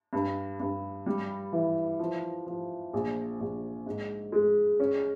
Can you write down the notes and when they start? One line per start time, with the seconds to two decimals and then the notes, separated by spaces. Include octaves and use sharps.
0.13 G2
0.60 G2
1.06 G3
1.52 E3
1.99 F3
2.47 F3
2.93 A#1
3.40 A#1
3.86 G#2
4.32 G#3
4.80 C#4